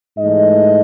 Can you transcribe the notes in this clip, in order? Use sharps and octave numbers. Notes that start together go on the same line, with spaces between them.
G#2 E3 A3 D#5